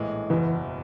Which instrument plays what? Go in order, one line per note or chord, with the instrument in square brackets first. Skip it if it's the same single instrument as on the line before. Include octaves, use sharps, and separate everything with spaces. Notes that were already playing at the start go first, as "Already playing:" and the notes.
Already playing: [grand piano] A#1 A2 E3 G#3
[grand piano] F#1 E2 B2 [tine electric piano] E3